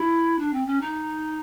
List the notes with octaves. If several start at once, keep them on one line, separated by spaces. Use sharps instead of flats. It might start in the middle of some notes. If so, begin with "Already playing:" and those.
Already playing: E4
D4
C4
C#4
D#4